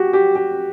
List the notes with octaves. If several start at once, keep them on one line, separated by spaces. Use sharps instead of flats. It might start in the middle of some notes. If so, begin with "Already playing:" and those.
Already playing: F#4 G4
G4
G4